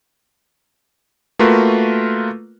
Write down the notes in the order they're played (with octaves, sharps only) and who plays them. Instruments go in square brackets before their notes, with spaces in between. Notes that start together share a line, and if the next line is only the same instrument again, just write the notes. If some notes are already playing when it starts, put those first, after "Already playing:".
[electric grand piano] A3 A#3 F4 F#4 A#4 B4